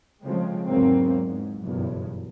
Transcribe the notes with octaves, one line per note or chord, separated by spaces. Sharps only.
C#3 F3 G#3 A3 C4
G#1 E2 C#3 F#3 A#3 C4
G#2
F#1 B1 E2 G2